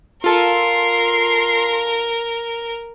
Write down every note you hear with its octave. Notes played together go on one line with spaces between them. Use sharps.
F4 A4 A#4 C6